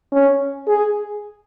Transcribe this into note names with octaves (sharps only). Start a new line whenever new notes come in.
C#4
G#4